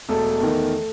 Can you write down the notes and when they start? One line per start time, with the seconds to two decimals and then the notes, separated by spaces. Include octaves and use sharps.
0.09 E1 A3 A4
0.40 E2 D#3